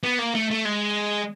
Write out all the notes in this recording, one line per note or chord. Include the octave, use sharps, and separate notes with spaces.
B3
A#3
A3
A3
G#3